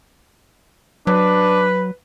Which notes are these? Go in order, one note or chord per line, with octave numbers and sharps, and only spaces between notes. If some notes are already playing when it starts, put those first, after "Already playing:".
F#3 D4 B4